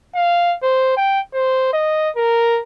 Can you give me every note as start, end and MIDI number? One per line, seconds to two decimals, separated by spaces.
0.15 0.55 77
0.62 0.95 72
0.97 1.20 79
1.33 1.69 72
1.73 2.10 75
2.16 2.60 70